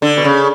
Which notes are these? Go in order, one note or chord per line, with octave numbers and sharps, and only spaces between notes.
D3
B2
C#3